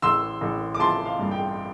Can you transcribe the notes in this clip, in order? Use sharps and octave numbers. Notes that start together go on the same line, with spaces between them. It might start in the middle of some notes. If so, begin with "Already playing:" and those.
A1 C6 E6
A1
D6
F3 A5 C6
F5
G2
G5